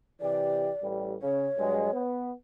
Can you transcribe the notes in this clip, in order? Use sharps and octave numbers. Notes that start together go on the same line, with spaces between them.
C3 E3 G4 D5
A1 G3
C#3 C#5
G2 F#3 G#3
B3